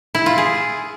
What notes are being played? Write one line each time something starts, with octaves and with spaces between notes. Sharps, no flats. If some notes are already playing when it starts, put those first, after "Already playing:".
E4
F4
G#4